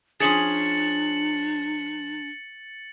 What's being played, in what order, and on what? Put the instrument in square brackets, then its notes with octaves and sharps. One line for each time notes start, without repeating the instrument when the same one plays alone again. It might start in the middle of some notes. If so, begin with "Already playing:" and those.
[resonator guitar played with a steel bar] F3 C#4 G#4 [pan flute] D4 [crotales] A6 C#7 F#7